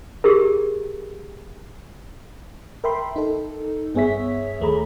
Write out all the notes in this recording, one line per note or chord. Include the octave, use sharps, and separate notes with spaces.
G4 G#4 A#4
A#4 E5 G5 B5 C6
D#4 A4
G2 B3 G#4 C#5 E5 B6
D#2 A3 G#4 A#5 B5